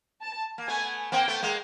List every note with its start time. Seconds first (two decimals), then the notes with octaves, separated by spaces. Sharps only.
0.22 A5
0.58 A#3
0.68 A3 B3 G#5
1.12 A#3 C4 G5
1.28 A3 B3
1.43 G#3 A#3